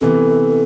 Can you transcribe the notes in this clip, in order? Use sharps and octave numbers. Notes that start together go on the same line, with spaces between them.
C3 E3 B3 A4